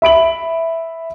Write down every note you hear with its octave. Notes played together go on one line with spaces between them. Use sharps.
E5 B5 D7 F#7